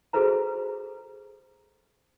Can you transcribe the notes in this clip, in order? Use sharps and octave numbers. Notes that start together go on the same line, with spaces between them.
F#4 G#4 A4 B4 C5 A#5